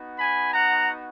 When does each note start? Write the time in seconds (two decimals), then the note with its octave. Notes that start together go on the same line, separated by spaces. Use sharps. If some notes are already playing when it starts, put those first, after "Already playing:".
Already playing: B3 D#4 F#4
0.17 G#5 B5
0.53 F#5 A#5